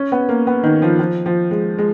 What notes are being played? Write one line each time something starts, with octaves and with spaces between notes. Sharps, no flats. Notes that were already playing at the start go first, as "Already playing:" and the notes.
Already playing: C#4
B3
A#3
B3
D#3
F3
F3
F3
G#3
G#3